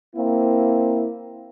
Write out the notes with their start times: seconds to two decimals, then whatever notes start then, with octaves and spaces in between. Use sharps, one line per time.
0.16 A#3 C4 E4